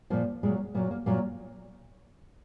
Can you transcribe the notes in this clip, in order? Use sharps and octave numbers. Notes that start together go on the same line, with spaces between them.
A#2 F3 A#3
A#2 F#3 G#3
A#2 F#3 A#3
A#3
A#2 F#3 A#3